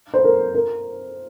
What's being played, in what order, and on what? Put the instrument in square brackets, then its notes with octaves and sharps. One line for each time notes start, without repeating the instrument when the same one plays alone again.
[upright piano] C5
A#4
A#4